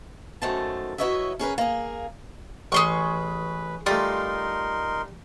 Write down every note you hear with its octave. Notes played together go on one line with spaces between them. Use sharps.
F#2 D#3 A3 C5 A5
F#3 E4 B4 C#5 D#5 E5
C#4 G#4 A#4 B4
A#3 G#4
A1 G#4 B4 C6 C#6
G3 A3 D#4 F4 A#4 C6